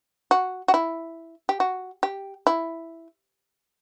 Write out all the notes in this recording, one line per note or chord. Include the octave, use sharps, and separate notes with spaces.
F#4
F#4
E4
G4
F#4
G4
E4